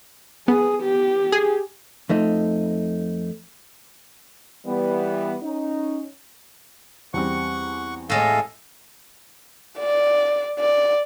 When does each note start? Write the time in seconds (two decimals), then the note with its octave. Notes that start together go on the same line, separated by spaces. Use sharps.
0.48 B3 G#4
0.83 G4
1.32 G#4
2.09 F2 A3 D#4
4.65 E3 G3 B3
5.42 C#4 D#4
7.14 E2 G3 C4 F#5 C#6
8.10 A2 G#3 A4 F5
9.79 D5
10.59 D5